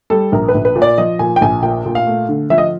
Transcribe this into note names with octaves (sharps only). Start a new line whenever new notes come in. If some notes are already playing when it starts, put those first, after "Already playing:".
G3 A4
A#1 A#4
B4
A#1
B4
A#2
D5
F3 D#5
A#2 G#5
G5
A#1 G#5
A#2 G5
A#2
F5
A3
D3
F3 E5
D#5